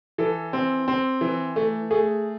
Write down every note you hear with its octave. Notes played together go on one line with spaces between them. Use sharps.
E3 A4
C4
C4
E3
A3
A3 G#4